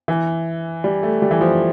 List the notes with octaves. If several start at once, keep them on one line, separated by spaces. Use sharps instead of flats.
E3
G3
A3
G3
E3
F3